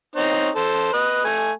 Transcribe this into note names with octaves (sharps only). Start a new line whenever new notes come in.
C4 D#4 C#5
A4 C5
B4 D#5
A3 G#5